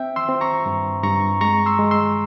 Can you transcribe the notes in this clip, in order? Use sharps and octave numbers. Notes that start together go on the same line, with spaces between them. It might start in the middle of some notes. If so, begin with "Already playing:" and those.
Already playing: C4 E5 G5
C6 E6
C4
A#5 C#6
G2
G2 A#5 C#6
G#3 A#5 C#6
C6 E6
G#3
C6 E6